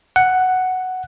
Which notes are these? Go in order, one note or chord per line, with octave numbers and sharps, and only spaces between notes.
F#5